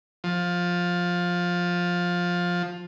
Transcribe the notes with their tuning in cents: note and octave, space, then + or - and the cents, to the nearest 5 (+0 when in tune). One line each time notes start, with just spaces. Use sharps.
F3 +15